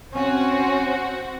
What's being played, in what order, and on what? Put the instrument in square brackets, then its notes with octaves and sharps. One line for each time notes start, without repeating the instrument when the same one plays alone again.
[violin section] C4 F#4 [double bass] C#4